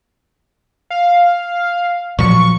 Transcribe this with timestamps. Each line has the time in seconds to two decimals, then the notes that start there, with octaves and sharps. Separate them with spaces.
0.90 F5
2.19 A#2 F3 F#3 C#6